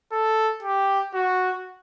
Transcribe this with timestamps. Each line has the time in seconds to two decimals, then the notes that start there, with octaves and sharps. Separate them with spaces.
0.12 A4
0.63 G4
1.15 F#4